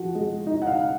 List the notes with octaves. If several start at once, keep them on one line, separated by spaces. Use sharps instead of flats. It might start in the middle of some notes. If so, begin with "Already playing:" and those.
Already playing: F3 F#4
G#3
D#4
F#5
F5